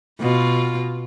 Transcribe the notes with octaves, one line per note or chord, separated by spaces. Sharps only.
B2 F4